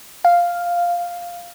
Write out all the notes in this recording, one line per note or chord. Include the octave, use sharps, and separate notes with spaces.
F5